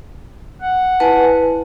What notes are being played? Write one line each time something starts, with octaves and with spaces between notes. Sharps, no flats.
F#5
E4 B4 G#5 A5